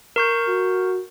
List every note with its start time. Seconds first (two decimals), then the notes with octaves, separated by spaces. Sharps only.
0.16 A#4 C#6 G6
0.47 F#4